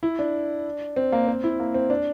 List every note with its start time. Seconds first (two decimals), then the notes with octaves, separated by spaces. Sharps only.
0.03 E4
0.19 D4
0.96 C4
1.12 A#3
1.28 C4
1.44 E4
1.60 A#3
1.74 C4
1.90 D4